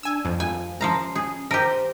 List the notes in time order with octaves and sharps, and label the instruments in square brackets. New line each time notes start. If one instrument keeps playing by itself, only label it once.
[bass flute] D4 [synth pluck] G#5 E6
[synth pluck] F2 [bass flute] F3
[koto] G#5
[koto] F3 F5 A#5 [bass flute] C#4
[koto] G#4
[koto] G4 A#4 [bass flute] C5